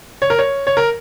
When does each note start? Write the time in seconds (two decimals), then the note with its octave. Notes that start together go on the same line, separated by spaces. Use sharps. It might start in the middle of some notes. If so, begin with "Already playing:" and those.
0.22 C#5
0.30 A#4
0.39 C#5
0.67 C#5
0.77 A#4